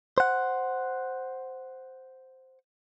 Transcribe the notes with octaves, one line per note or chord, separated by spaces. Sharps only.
C5 F#5